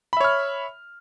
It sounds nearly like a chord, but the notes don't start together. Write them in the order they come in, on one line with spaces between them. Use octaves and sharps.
B5 E5 C#5 F6